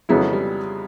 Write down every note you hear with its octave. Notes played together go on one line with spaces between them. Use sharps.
F2 C#3 F#3 G#3 B3 E4
G3